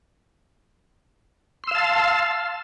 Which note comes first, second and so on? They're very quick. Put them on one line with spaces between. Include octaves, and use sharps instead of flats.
C6 E6 F5 A5